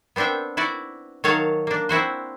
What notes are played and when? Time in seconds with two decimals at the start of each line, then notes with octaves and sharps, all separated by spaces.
0.16 B3 C4 D4 E5 G5
0.57 E4 F#4 D5
1.24 D#3 F#3 C#5 F5 A5
1.67 A#3 D4
1.89 C4 E4 F#4 C5